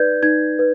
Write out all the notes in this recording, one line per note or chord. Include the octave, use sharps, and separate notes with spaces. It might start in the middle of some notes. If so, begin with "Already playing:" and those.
Already playing: D#4 B4 D5 G6 G#6
D#4 G#6
B4